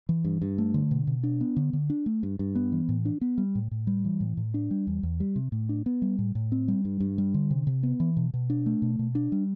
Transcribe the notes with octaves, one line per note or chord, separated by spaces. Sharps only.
E3
G2
G2
A3
D3
B2
B2
D4
B3
D3
D3
D4
A3
G2
G2
B3
E3
A2
D4
B3
G3
A2
A2
G3
E3
A2
A2
D4
G3
E2
E2
G3
C3
A2
D4
B3
G3
A2
A2
C4
G3
G2
G2
G3
D3
C3
C3
B3
E3
B2
B2
D4
A3
B2
B2
D4
G3